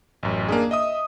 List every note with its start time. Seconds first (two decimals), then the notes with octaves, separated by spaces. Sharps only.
0.23 A1 F#2
0.49 A#3 D4 G#4
0.71 D#5 E5 D#6